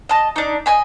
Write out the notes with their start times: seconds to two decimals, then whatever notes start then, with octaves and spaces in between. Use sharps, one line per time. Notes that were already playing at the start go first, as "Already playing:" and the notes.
0.09 D#5 A5
0.36 D4 D#4
0.66 D#5 G#5 B5